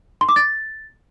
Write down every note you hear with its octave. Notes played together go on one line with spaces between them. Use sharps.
C6
D6
A6